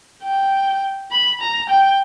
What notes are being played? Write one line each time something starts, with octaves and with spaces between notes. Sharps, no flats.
G5
B5
A#5
G5